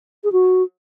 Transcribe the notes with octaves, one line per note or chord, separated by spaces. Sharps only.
G#4
F#4